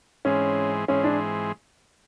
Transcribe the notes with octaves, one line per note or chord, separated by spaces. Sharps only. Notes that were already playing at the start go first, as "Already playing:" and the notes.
G#2 E3 G#3 C4 C#4
G#2 E3 G#3 C4 C#4
D4